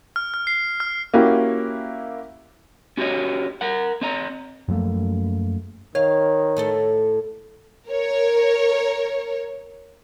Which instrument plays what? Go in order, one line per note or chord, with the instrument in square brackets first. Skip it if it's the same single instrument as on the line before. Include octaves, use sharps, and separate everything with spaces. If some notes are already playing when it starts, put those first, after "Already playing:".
[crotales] F6
F6
C7
F6
[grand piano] A#3 C#4 E4 F#4 G4
[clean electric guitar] C#4 F#4 G4 A#4 C#5 D#5
A#4 F#5
C4 D#5 A#5
[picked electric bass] F#2 F3 A3 A#3
[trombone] D#3 [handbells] C#5 [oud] F5
[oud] A2 A3 A4
[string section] A#4 C#5